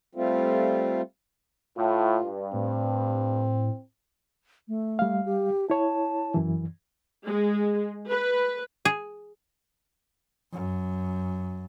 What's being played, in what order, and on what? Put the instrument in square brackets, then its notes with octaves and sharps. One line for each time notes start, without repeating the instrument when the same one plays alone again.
[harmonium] G3 A3 C4 F4
[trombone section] A2 [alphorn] F4
[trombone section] G2
[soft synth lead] A2 [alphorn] C4
[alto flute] A3
[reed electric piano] G3 F5
[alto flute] G4
[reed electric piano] E4 C#5 [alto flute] A5
[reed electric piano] F#2 E3
[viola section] G#3
B4
[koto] G#4
[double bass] F#2